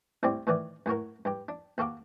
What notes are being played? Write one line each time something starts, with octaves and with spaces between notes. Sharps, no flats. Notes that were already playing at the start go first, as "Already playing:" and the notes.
C2 A2 G3 C4 D5
A2 D#3 E3 D5
F#2 A2 F#4 A#4
G2 G4
D4
D#2 F#4 A4 F5 D6